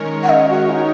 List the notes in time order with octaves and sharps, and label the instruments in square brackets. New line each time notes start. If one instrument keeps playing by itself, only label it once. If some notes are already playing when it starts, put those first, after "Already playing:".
Already playing: [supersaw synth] D#3 G#3 C#4 A#4 C#5
[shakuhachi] F#5
D#5
F#4
D#4